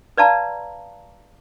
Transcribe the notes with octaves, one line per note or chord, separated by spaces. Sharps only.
B4 D5 F5 A5 A#5